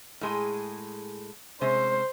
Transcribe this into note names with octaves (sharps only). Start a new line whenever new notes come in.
A2 G#3 G#4
C3 G#3 C#4 C5